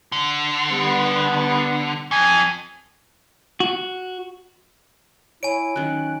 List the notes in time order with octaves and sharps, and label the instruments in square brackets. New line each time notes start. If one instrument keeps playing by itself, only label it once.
[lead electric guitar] D3
[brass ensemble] G3 B3
[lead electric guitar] F2 [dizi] G#5
[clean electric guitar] F#4
[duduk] E4 [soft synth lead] C#5 [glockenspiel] G#5 D7
[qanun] D#3 F#3 [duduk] C#4 [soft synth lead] F#6